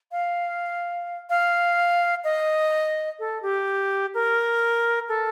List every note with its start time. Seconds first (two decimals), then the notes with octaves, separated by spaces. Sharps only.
0.12 F5
1.30 F5
2.24 D#5
3.19 A4
3.42 G4
4.14 A#4
5.09 A4